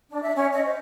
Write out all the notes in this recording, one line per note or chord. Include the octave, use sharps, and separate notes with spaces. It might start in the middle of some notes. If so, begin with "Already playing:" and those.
D4
E5
C#4
D#5
C5